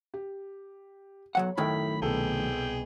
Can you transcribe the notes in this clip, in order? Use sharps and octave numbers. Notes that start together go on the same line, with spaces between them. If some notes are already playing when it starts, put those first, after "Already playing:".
G4
B1 F#3 C#5 F#5
F#2 A2 D#3 E4 A4 G5 B5
C2 B2 G#4 A4 G5